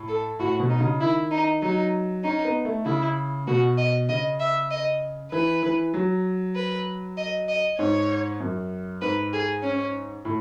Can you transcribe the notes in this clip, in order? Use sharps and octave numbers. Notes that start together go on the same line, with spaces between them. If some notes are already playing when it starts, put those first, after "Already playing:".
Already playing: A2
A4
A2 F#4
B2
D#4
C#3
D#3 E4
D#4
F#3 D#4
C#4 D#4
B3
A3
C#3 E4
B2 F#4
D#5
C#3 D#5
E5
D#5
E3 B4
E3
F#3
B4
D#5
D#5
G#2 C#5
F#2
G#2 B4
G#4
C#4
A2